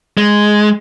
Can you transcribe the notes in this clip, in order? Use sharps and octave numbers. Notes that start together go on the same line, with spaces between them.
G#3